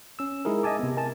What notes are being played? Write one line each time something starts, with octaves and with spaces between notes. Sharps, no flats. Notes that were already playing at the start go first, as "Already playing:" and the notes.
C#4 E6
G#3 D#4 E4 G#4 A#4
D#5 E5 G#5 A5 D6
C3 B3
A#4 G#5 A5